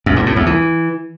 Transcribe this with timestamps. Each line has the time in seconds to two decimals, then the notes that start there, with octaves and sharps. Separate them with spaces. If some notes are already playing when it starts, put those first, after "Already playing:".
0.06 F#2
0.16 G2
0.26 A2
0.36 E2
0.46 E3